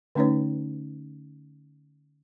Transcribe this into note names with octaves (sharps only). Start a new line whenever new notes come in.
D3 A3 C#4 D#4 B4 C#5